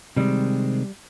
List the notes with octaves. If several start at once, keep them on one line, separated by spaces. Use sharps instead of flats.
C3 D#3 G3 G#3 C4